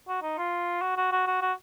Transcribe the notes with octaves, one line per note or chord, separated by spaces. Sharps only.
F#4
D#4
F4
F#4
F#4
F#4
F#4
F#4